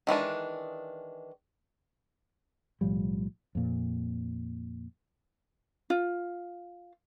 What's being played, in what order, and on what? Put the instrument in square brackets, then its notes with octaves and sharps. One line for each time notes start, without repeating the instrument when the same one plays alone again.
[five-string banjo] D#3 E3 G#3 D4
[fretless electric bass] B1 A2 F3 G3
F2 A#2
[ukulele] F4